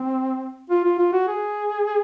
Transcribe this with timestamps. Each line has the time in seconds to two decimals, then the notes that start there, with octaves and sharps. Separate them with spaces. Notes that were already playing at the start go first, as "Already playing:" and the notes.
Already playing: C4
0.70 F4
0.84 F4
0.99 F4
1.13 F#4
1.28 G#4